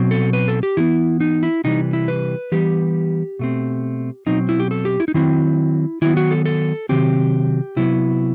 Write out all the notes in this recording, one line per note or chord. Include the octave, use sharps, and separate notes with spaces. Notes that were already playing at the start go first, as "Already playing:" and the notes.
Already playing: B2 F#3 C4
A4
B4
A4
G4
E3 B3 E4
D#4
E4
C3 E3 G3 D#4
E4
B4
E3 G3 B3 G4
B2 A3 C4
B2 F#3 C4 D#4
E4
G4
A4
G4
E4
D#4
D#3 F#3 C4 E4
D#3 F#3 B3 E4
F#4
A4
A4
C3 D#3 F#3 C4 G4
C3 F#3 B3 E4